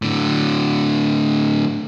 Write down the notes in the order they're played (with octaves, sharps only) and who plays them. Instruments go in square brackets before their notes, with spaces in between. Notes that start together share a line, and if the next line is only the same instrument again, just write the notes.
[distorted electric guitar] A2 D3